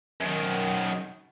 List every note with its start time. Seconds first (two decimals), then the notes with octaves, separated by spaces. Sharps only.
0.21 F#2 D#3